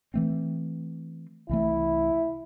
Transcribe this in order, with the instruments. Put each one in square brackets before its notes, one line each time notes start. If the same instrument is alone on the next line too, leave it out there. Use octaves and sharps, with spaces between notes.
[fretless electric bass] E3 A3 C4
[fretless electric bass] C2 E3 A3 [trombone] E4